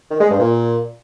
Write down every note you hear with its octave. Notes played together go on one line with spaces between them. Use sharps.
D#3
G#3
G2
A#2